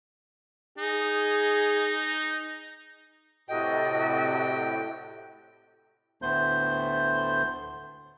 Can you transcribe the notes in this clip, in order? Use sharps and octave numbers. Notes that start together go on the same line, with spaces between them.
D#4 G#4
A2 C3 F#4 A4 D#5 G5
D2 A2 A3 B3 C5 G6